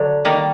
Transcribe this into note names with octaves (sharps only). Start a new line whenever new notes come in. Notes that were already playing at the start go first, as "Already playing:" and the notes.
Already playing: D3 F#3 D4
D#3 G3 A#3